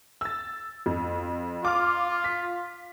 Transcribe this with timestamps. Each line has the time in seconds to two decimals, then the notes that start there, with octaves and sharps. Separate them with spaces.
0.21 E6 A6
0.86 F2
1.65 F4 D6 F6
2.24 B6